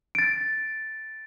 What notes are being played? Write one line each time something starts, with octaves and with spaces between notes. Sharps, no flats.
A6 D7